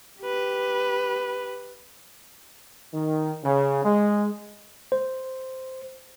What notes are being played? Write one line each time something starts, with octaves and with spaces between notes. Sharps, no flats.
G4 B4
D#3
C#3
G#3
C5